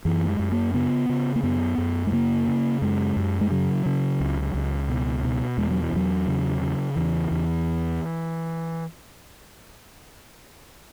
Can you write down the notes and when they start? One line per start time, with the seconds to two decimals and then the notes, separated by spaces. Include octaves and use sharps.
0.05 F#2 E3
0.24 A#3
0.29 G#3
0.39 F#2
0.52 A#3
0.74 C#3 B3
1.09 C#3
1.36 A#3
1.43 F#2 B3
1.78 F#2
2.07 G#3
2.12 C#3 A#3
2.47 C#3
2.82 F#2 G#3
3.16 F#2
3.41 G#3
3.51 C#3 F#3
3.86 C#3
4.20 C#2
4.54 C#2
4.89 B2
5.24 B2
5.57 E2 G#3
5.71 F#3
5.83 E3
5.93 E2 F#3
6.28 C#3
6.62 C#3
6.96 E2 E3
7.31 E2